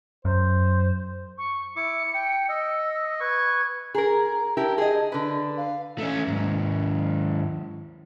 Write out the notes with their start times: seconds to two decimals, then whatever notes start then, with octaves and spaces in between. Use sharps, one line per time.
0.25 F#2 C5
1.38 C#6
1.76 E4 D6 C#7
2.14 G5
2.49 D#5 E6
3.20 B4 C#6 G#6
3.95 G#4 A#4 A#5
4.57 E4 G4 A#4 A5
4.78 G#4 D#5
5.12 D3 G#4 B4
5.57 F5
5.98 A3 C#4
6.28 D#2 G#2